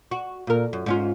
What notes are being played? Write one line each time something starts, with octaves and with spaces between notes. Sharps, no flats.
F#4
A#2 A#4
F#2
G#2 C#4 F4